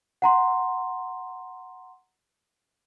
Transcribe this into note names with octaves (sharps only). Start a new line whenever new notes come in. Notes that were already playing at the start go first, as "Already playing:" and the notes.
F#5 A#5 C6